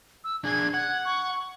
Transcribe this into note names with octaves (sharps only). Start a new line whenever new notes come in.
E6
D4 G#4 G#6
F#5 G#6
C#6